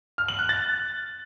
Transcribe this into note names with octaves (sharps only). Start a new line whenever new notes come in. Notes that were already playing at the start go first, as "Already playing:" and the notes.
F6
F#7
F#6
A6